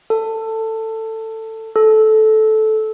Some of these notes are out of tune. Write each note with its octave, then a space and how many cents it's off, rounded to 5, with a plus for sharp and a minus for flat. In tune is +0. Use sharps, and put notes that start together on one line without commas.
A4 +15
A4 -15